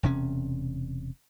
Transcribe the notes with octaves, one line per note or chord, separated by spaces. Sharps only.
E1 C3 C#4